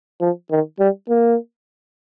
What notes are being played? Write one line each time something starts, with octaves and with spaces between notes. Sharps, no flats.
F3
D#3
G3
A#3